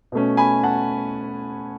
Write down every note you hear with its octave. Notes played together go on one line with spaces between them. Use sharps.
B2 A3 C#4
G#5 B5
F#5 A5